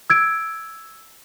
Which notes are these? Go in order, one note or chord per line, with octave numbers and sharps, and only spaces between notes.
E6 G#6 D7